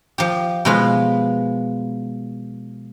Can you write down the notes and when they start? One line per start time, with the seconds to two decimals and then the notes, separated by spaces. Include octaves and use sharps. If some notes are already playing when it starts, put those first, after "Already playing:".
0.18 F3 G4
0.65 B2 F3 G#3 F4 B4